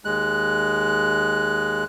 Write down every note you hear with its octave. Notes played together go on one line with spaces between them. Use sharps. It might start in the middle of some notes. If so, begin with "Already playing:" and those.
D#2 G#3 F#6